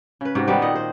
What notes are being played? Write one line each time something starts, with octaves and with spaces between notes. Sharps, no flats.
C#3 B4
G#2 C3 F#4
D#3 G3 B3
A#2 D#5 F#5
C5